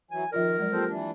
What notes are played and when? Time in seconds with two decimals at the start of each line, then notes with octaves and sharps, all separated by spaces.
0.11 E3 F#3 G#5
0.32 D#3 F3 F4 A#4 D5
0.57 F#3 G#3 D5
0.72 A#3 C4 F4 G4 A4 C5
0.88 E3 D4